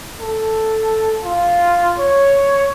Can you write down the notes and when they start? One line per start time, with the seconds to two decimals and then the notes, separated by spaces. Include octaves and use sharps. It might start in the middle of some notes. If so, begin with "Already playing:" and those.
0.20 A4
1.24 F4
1.99 C#5